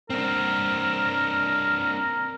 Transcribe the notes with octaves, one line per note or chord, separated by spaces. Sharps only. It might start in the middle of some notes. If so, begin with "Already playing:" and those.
C4 D4 A#4